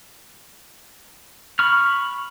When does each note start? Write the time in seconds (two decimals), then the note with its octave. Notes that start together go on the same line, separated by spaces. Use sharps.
1.59 B5 C#6 F6